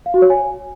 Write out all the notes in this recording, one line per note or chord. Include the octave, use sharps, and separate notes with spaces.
F5
F#4
C#5
G#5